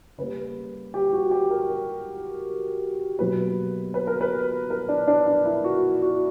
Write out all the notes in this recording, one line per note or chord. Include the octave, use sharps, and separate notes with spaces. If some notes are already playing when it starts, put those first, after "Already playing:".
C#3 G3 A#3 B4
G4
F#4
G4
A#4
A#4
B2 F#3 A#3 B4
B4
A#4
B4
A#4
D4
D4
D4
E4
F#4
F#4